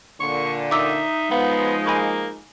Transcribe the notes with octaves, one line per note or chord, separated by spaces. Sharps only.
A#2 D3 C#6
D#4 E5 D6 E6
F3 G#3 B3 F5 F#5
A#3 G#5 B5 C#6